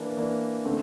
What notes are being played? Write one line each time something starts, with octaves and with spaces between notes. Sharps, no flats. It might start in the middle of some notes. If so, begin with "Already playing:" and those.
Already playing: E3 A#3 D4
E3 A#3 D4
D3 A3 C4 E4